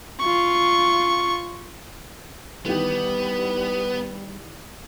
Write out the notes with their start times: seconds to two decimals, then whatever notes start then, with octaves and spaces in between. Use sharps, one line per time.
0.20 F4 C#6
2.66 D#3 E3 G3 B3 G4